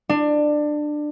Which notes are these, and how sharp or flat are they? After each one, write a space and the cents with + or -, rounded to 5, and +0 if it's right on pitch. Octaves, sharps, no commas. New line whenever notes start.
D4 +20